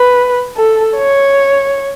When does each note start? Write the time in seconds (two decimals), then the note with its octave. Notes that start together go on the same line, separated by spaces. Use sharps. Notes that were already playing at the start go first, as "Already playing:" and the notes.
Already playing: B4
0.56 A4
0.97 C#5